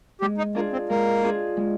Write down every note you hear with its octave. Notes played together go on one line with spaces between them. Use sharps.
G#3 G4
D#4
A#3 D4 F4 G#4
C4
G#3 A#3
D4 F4 G#4
G#3